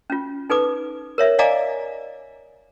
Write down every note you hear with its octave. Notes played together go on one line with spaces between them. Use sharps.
C#4 F4
D#4 A4 B4 D6
A#4 C#5 E5
D5 D#5 F5 G#5 A#5 D6